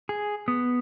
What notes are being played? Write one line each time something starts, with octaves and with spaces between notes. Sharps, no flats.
G#4
B3